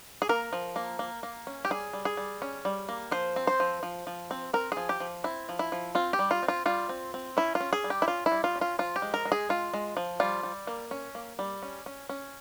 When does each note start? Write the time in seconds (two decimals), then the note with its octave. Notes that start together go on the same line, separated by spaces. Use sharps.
0.22 G#4
0.29 A#3 A#4
0.53 F3
0.76 A#3
0.99 A#3
1.23 A#3
1.47 C#4
1.65 G4
1.70 G3 G#4
1.93 G3
2.05 G#4
2.17 G3
2.42 C#4
2.65 G3
2.89 A#3
3.11 F3 C5
3.36 C4
3.47 C5
3.60 F3
3.83 F3
4.07 F3
4.31 C4
4.53 C4 A#4
4.72 G#4
4.77 F3
4.89 G4
5.00 F3
5.24 C4 E4
5.49 F3
5.59 E4
5.72 F3
5.95 C4 F4
6.13 G4
6.19 G3
6.31 F4
6.43 C4
6.48 F4
6.66 G3 F4
6.89 C4
7.14 C4
7.37 C#4 E4
7.55 F4
7.60 C#4
7.73 G#4
7.84 G3
7.90 G4
8.02 E4
8.08 C#4 F4
8.26 E4
8.32 G3
8.44 F4
8.56 C#4
8.61 F4
8.79 F3 F4
8.96 G4
9.02 G#3
9.14 A#4
9.25 G#3
9.32 G#4
9.49 G#3 F4
9.74 G#3
9.97 F3
10.20 G3 F4
10.43 G3
10.67 A#3
10.91 C#4
11.15 A#3
11.39 G3
11.63 C#4
11.86 C#4
12.09 C#4